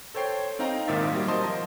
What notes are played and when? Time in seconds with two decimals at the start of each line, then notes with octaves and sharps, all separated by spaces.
0.15 A4 C5 C#5 G5 C7
0.59 C4 D#4 F5 G5 A#5
0.88 G#1 A#2 D#3 E5 A6
1.13 F#3 G3
1.28 A#4 C5 D#5 A5 C6 D#6
1.43 F3 A#4